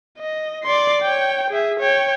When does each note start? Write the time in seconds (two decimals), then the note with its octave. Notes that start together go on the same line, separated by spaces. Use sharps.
0.18 D#5
0.64 D5 C6
1.02 C#5 G5
1.50 G#4 E5
1.80 C#5 G5